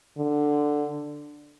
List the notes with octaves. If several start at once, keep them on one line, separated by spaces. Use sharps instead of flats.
D3